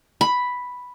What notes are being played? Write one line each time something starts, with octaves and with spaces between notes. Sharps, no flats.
B5